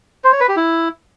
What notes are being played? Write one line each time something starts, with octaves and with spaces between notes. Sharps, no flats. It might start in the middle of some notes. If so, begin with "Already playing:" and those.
C5
C#5
B4
G4
E4